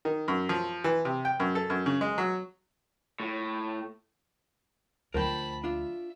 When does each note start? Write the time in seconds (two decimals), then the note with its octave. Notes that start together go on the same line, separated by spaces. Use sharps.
0.05 D#3
0.28 F#2
0.49 F3
0.84 E3
1.05 C3
1.25 G5
1.40 F#2
1.55 A4
1.70 F#2
1.86 C#3
2.01 G#3
2.18 F#3
3.20 A2
5.14 D2 F3 A#4 C5 G5 A5 B5
5.64 D4 F4 E5